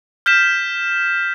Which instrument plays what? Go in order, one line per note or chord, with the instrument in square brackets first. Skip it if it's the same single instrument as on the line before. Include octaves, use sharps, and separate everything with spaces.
[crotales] F6 G6 B6 E7